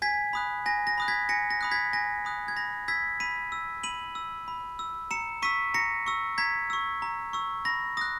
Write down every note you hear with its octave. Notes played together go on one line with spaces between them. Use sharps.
G#5 G#6 B6
B5 D#6 F#6
G#5 A#6
A#6
B5 D#6 F#6
G#6 B6
G#5 A#6 C#7
A#6
B5 D#6 F#6
G#6 B6
G#5 A#6
B5 D#6 F#6
G#6
B5 A#6
E6 G#6 B6
B5 B6 D#7
E6
B5 D#7 F#7
E6
B5
E6
A#5 C#7 E7
C#6 E6 B6 D#7
A#5 A#6 C#7
C#6 E6
A#5 G#6 B6
C#6 E6
A#5
C#6 E6
B5 A#6
D#6 F#6 A#6